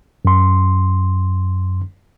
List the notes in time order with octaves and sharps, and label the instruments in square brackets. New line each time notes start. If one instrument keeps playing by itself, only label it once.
[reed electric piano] F#2 C6